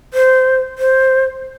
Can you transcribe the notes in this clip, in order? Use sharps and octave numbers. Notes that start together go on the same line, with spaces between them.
C5
C5